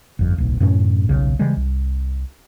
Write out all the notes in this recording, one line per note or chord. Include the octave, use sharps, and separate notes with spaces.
G1 F2
D1 B1
F#2 A2 C3 C#4
D#1 B1 C#3
C#3 E3 G3 G#3
C2